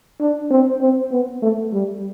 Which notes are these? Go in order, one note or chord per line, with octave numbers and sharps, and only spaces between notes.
D4
C4
C4
B3
A3
G3